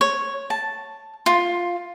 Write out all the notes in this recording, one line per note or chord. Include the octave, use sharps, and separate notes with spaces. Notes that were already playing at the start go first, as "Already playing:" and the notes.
C#5
A5
F4